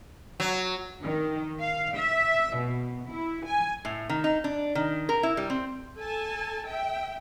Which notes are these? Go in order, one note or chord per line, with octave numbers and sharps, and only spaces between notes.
F#3
D#3
F5
E5
B2
E4
G#5
A2
D#3
D#4
D4
D#3
A#4
E4
G3
C4
A4 G#5 A5
E5 G5